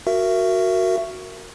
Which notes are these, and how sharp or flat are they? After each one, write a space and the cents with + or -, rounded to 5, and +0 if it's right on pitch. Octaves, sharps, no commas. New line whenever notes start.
F#4 +0 A#4 -10 E5 +25